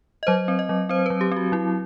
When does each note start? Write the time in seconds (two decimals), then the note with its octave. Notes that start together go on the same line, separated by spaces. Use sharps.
0.23 D#5
0.27 F#3 C5
0.48 C4
0.59 D#5
0.69 F#3
0.89 C4 C5
1.06 F#3 B4
1.21 G4
1.32 C4 F#4
1.52 F#3 E4